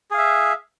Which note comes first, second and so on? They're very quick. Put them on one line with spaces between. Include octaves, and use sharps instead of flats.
G#4 F5 E5